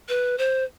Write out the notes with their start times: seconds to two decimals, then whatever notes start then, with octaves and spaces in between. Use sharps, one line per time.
0.09 B4
0.38 C5